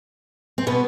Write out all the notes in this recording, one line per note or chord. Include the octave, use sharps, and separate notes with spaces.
C4
B2 B3